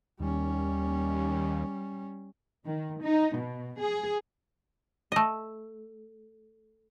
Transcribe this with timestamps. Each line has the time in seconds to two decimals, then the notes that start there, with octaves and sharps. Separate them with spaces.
0.20 D#2 G3 C#4
2.65 D#3
3.02 D#4
3.35 B2
3.79 G#4
5.12 A3 D#5